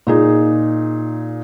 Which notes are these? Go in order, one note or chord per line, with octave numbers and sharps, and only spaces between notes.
A#2 D#4 G#4